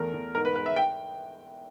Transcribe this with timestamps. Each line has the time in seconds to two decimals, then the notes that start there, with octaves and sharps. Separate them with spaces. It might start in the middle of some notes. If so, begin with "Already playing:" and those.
Already playing: E2 A3 A#4
0.14 E2
0.35 G#2 A#4
0.45 B4
0.55 G#3 B4
0.66 E5
0.76 G5